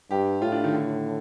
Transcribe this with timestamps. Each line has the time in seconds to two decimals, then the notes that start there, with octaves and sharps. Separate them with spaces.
0.11 G2 G4
0.42 A2 F4
0.52 D4
0.64 D#3
0.73 D3